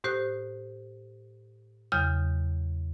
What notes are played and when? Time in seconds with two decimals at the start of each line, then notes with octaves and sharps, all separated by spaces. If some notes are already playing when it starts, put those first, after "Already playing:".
0.04 A2 G4 C5 D#6 F#6
1.92 E2 C#3 F#3 D#6 F6 G6